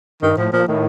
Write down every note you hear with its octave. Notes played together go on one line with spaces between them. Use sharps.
G2 D#3
A2 F3
A#2 F3
A2 D#3